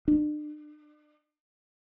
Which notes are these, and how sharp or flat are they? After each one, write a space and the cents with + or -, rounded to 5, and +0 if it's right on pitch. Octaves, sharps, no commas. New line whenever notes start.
D4 +40